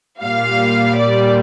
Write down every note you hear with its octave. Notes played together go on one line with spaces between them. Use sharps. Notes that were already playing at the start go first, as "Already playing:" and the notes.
A#2 G3 F5
D5